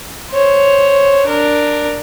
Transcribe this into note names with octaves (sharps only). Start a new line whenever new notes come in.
C5 C#5
D4 A#4